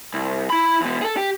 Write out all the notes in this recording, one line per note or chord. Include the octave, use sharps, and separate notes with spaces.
C2
E4 B5
E2 B2
G#4 A4
G4